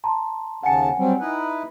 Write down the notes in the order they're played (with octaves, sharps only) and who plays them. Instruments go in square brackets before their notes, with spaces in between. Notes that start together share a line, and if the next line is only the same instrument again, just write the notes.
[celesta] A5 A#5 C6
[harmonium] D#2 C#3 A5 [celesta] F#5 G#5 C#7
[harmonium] F#3 G3 C4
D#4 E4 B4